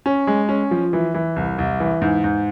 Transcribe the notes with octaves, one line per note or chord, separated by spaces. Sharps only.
C#4
G#3
C#4
F3
E3
E3
C2
C2
E3
G#2
G#2